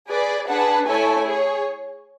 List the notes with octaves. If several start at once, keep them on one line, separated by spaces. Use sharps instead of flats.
G#4 B4 D5
D4 G#4 B4 F#5 A5
A3 E4 A4 C#5 G#5
G#4 C#5